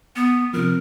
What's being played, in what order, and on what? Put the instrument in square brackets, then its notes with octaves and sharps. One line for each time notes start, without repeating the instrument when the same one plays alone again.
[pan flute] B3
[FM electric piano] C3 F3 [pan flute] A#4